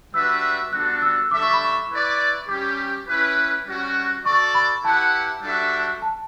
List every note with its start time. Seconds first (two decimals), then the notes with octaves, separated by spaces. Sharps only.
0.14 G3 D4 F#4 B4 E5 E6
0.73 G3 B3 D4 F#4 A4 F#6
1.02 E6
1.31 G3 D4 A4 E5 D6
1.42 C#6
1.53 B5
1.64 C#6
1.91 E4 B4 D5
2.48 G3 C#4 G4 D6
3.08 C#4 E4 B4
3.66 G3 C#4 F#4
4.26 F#4 A4 D5 C#6
4.55 B5
4.84 E4 G4 B4 F#5 A5
5.43 G3 D4 F#4 A4 E5
6.02 A5